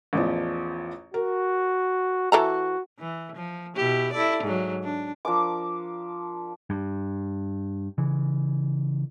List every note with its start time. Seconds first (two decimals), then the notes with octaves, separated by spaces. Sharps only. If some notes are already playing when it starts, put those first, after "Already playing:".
0.13 A1 E2 F3
1.14 F#4 A#4
2.32 E3 F#4 A4 A#5
2.99 E3
3.36 F3
3.77 B2 E4 G4
4.13 E4 A4 D5
4.44 G#2 F#3
4.84 D4
5.25 F3 D4 A#4 D6
6.70 G2
7.98 C#3 E3